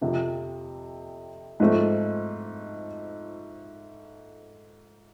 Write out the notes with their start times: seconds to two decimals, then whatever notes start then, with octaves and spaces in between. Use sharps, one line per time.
0.01 F2 C3 F3
1.60 G#2 F3 A3 C4